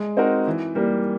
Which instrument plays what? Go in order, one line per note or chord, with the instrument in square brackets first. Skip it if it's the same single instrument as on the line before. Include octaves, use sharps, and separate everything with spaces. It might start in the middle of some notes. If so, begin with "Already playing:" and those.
Already playing: [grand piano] G#3
C4 D#4 F#4 A#4
E3
G3 A#3